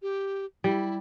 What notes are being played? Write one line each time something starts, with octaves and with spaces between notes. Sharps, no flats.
G4
G3 E4